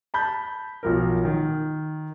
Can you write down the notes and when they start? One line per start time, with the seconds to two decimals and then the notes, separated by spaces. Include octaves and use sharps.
0.14 A5 B5 G6
0.83 B1 F3 A#4
1.25 D#3